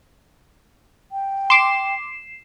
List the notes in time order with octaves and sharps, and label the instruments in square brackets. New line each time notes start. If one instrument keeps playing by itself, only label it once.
[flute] G5
[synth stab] C6 D6 [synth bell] C7 E7